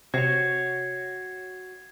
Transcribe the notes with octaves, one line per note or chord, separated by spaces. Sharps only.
C3 F#4 C#5 G#6 C7